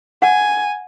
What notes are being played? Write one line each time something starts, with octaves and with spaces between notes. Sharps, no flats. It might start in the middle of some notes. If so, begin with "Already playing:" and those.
F#5 G#5